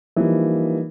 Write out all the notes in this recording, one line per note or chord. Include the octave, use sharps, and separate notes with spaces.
E3 F3 G3 A#3 D#4